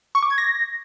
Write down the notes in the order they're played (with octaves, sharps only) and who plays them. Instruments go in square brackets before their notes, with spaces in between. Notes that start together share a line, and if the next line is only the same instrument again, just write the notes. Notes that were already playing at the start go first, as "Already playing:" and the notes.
[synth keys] C#6
D6
G#6
A#6